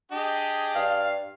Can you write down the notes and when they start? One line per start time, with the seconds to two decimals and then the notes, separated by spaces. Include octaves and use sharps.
0.12 D4 G4 G#4 D#5
0.75 G2 F5